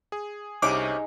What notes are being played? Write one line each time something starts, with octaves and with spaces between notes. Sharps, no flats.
G#4
C2 C3 C#4 D#4 G#4 D6